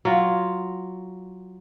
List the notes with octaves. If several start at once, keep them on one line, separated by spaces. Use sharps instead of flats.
F#3 F4